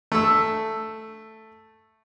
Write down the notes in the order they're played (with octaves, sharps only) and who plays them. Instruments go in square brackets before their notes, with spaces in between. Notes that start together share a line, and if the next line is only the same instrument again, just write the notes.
[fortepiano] A3 E6